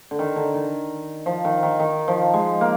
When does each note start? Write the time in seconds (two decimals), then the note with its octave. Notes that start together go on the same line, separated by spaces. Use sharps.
0.11 D3
0.19 D#3
0.36 D3
0.54 D#3
1.26 F3
1.45 D#3
1.63 D#3
1.80 D#3
2.08 F3
2.34 G#3
2.61 A#3